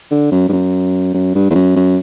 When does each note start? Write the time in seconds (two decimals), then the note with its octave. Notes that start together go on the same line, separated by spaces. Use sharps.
0.11 D3
0.32 F#2
0.49 G2
0.53 F#2
1.14 F#2
1.35 G2
1.50 E2
1.55 F#2
1.76 F#2